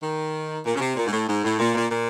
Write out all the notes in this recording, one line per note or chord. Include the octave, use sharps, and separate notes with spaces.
D#3
A#2
C#3
C3
A#2
G#2
A2
G#2
A2
A#2
A#2
A#2